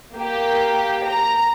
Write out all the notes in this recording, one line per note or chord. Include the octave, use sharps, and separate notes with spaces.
A#3 G4
A#5